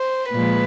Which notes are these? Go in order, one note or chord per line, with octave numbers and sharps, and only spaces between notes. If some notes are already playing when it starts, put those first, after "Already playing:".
Already playing: C5
A#2 F3 G#3 B4